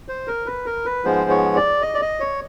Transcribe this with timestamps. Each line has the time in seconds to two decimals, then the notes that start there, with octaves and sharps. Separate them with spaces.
0.08 C5
0.27 A#4
0.46 B4
0.66 A#4
0.85 B4
1.04 G#2 F3 G#3 B3 C5
1.30 C#5
1.56 D5
1.82 D#5
1.94 D5
2.02 D#5
2.20 C#5